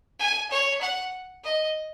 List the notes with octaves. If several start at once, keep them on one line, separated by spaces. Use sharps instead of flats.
G#5
C#5
F#5
D#5